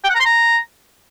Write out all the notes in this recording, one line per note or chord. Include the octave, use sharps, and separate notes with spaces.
G5
F#5
A#5
C6
A#5